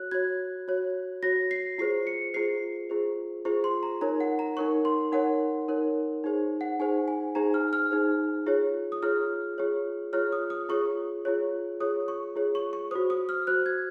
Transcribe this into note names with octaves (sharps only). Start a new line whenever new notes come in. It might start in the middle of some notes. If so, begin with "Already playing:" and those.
Already playing: F#4 C#5 F#6
F#4 C#5 G#6
F#4 C#5
F#4 C#5 A#6
C7
F4 G#4 C5 C7
C#7
F4 G#4 C5 C7
F4 G#4 C5
F4 G#4 C5 C#6
C6
A#5
D#4 A#4 C#5 A#5
F#5
A#5
D#4 A#4 C#5 C#6
C6
D#4 A#4 C#5 F#5
D#4 A#4 C#5
D#4 G#4 C5
F#5
D#4 G#4 C5 G#5
G#5
D#4 G#4 C5 A#5
F6
F6
D#4 G#4 C5
F4 G#4 C#5
D#6
F4 G#4 C#5 F6
F4 G#4 C#5
F4 G#4 C#5 F6
D#6
D#6
F4 G#4 C#5 C#6
F4 G#4 C#5
F4 G#4 C#5 D#6
C#6
F4 G#4 C#5
C#6
C#6
F#4 C5 D#6
D#6
F6
F#4 C5 F#6
G#6